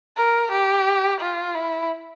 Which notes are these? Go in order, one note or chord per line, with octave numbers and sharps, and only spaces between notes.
A#4
G4
F4
E4